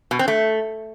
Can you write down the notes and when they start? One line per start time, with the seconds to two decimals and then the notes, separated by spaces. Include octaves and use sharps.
0.11 B2
0.19 C4
0.28 A3